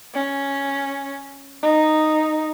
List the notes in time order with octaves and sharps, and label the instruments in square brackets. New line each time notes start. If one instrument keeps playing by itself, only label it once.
[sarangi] C#4
D#4